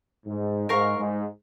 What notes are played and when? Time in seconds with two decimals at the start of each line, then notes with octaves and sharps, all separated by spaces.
0.26 G#2
0.69 G#2 A#4 F5 A#5 C#6
0.98 G#2